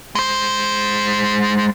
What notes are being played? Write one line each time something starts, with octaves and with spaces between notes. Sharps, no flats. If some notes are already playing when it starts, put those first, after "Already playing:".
G#3 C5